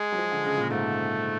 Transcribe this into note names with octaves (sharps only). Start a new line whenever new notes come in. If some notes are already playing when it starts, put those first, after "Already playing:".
Already playing: G#3
F#3
F3
D3
C#3
A#2
G#2 A3